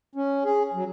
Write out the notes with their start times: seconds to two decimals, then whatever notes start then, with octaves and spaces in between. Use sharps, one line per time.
0.15 C#4
0.45 G#4
0.74 F#3